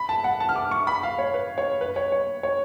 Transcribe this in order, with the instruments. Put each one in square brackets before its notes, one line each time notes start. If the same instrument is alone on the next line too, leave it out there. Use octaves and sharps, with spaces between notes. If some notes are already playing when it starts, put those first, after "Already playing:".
Already playing: [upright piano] B5
A5
F#5
A5
F6
D6
C#6
B5
F5
C#5
B4
C#5
B4
C#5
C#5
C#5